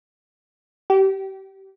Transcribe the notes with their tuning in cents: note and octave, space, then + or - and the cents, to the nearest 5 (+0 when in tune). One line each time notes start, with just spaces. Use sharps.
G4 -25